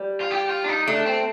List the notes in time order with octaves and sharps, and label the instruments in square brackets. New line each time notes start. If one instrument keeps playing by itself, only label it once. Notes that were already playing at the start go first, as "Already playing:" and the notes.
Already playing: [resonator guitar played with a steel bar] G3
[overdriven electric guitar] F4
G4
F4
D4
D#4
[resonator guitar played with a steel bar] A3 [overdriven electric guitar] D4
[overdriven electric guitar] C4